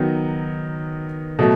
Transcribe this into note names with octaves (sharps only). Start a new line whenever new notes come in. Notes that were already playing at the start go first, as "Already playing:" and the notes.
Already playing: D#3 F#3 B3 D#4
B2 F#3 A3